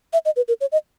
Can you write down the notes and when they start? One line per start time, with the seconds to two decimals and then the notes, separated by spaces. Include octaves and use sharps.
0.13 E5
0.25 D#5
0.36 B4
0.48 A#4
0.61 C#5
0.72 D#5